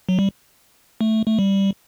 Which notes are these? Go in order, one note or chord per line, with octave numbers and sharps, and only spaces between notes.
F#3
G3
A3
A3
G3